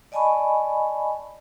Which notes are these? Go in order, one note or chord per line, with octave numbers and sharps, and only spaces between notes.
D5 D#5 G#5 A5 B5 C#6